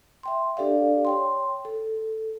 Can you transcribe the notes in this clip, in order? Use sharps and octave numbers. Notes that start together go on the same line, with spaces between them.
E5 G5 C6
D4 G4 A4 D5 F5
C#5 G5 C6
A4